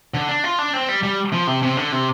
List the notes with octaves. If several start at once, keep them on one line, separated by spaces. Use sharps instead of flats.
D3
D4
F4
D4
C4
G3
G3
F3
C3
C3
D3
C3